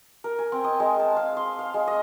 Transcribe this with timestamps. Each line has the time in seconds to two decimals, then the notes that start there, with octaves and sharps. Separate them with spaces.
0.24 A#4
0.39 G#5
0.52 C4
0.64 D#5
0.80 G#3
1.00 A5
1.17 F5
1.37 C6
1.59 F5
1.74 G#3
1.88 D#5